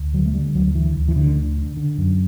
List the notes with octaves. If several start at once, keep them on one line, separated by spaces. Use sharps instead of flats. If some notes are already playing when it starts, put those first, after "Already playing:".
Already playing: D2
D3 F#3
A3
D3 G3
D2 F#3
D3 E3
D2
E3
D2 D3
D3
D3
D3
F#2